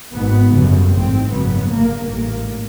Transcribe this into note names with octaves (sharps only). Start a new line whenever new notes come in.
G#1 G#2 B3
G1 F#2 C#3
A1 G#2 C4
G#1 F#2 C#3 B3
G1 G2 A#3
A1 G#2 A#3